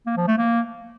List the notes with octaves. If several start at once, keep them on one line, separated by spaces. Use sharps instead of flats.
A#3
F3
A3
A#3